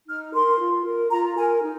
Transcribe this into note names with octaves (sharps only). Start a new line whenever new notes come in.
D#4 F6
A#4 C6
F4
A#4
F4 A#5
A#4 G#5
D#4